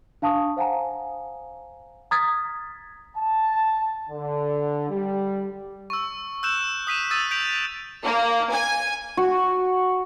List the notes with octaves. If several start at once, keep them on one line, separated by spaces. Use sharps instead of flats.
D4 F5 A5 C#6 D#6
C5 F5 F#5 G#5 A#5
A#5 D#6 F6 G#6 A6 B6
A5
D3
G3
C#6 E6
E6 F#6 G6 E7
D#6 B6 D#7 E7
D#6 E6 A6 D#7
G6 B6 D7 F7
A#3
G#5
F#4